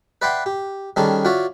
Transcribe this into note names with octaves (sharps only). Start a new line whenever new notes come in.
B4 D5 E5 F#5 G5 C6
G4
D#3 G3 C#4 D4 G#4 A4
F4 F#4 C#5 D5 E5